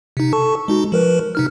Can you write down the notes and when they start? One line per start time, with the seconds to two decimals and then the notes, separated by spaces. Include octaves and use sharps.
0.17 C3 D#4
0.33 A4 A5 C#6
0.68 G#3 D#4 F#4
0.92 F3 A#4 B4
1.35 C3 D#4 F6